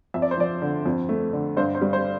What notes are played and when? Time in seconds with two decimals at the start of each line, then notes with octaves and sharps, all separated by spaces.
0.14 F2 E5
0.22 D5
0.31 C5
0.38 F3 D5
0.62 D3
0.86 F2
1.09 A3
1.33 D3
1.57 G2 C5
1.75 C5
1.81 G3
1.93 C5